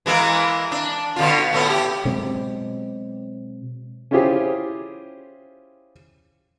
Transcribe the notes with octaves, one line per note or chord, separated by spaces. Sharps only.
E3 G#3 A#3
D4
B2 D3 F4
A2 A3 B3
G4
B2 F#3 G#3 C4
C#4 E4 F4 G4 G#4 C5